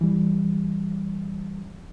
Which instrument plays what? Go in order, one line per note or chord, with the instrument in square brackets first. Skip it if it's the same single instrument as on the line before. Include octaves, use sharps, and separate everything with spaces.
[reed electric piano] E3 G3